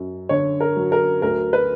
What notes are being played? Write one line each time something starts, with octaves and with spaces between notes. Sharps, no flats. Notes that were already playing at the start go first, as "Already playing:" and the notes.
Already playing: F#2
D3 C#5
A#4
F#3
A#4
D2 A#4
B4